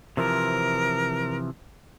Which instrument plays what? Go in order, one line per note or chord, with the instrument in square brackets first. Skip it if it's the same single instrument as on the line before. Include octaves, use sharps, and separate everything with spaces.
[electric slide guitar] C3 E3 F3 [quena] A#4